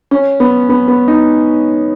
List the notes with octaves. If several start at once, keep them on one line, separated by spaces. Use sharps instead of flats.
C#4
B3
B3
B3
D#4